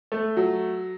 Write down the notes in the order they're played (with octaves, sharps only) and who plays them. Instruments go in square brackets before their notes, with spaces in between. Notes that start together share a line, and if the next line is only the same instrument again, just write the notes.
[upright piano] A3
F#3